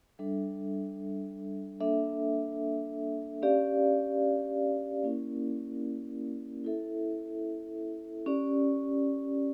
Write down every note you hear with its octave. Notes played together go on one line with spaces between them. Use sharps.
G3 D4 A4 E5
A#3 D4 A4 E5
C#4 G4 D5 F5
A#3 C#4 E4 A#4
E4 A4 E5
C#4 G4 D5